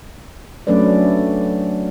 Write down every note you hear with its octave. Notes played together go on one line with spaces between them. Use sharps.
F#3 A3 C#4 D4 B4 D5